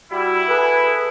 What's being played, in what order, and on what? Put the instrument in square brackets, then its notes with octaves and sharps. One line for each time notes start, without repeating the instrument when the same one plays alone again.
[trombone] G3 [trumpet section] E4 [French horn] F#4
[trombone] G#4 [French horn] A4 [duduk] B4